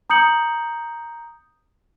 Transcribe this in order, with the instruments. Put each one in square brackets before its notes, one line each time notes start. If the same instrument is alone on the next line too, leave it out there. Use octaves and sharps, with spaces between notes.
[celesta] A#5 D#6 G6 C#7 F#7